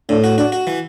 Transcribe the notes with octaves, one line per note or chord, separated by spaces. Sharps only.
A2 D4
F#4
D4 F#4
F#4
E3